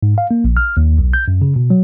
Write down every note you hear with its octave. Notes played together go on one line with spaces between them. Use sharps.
G#2
F5
A#3
A#1
F6
D#2
B1
G6
F#2
C#3
B2
F#3